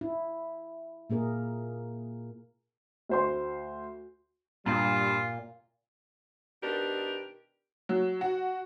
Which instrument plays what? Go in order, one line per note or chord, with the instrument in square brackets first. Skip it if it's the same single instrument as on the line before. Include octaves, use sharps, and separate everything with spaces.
[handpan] E4
A#2 A#3 G#4 A#4
[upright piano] D2 C5 C6
[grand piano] G2 [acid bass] A#2 [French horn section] G3 [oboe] F4
[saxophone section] B2 D#3 D4 G4 A#4
[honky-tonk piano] F#3
F#4